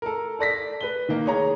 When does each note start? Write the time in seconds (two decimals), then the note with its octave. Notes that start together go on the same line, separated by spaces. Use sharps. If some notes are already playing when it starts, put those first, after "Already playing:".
0.02 A4 A#4
0.39 A4 D5 A#6 B6
0.81 B4 G7
1.09 D#3 A#3
1.26 G#4 C#5 A#5